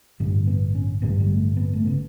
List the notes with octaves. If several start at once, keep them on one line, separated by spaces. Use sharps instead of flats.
A1 G2 D3
B3
C#4
A1 G2 D3 B3
G3
A3
B3
A3
C#3 B3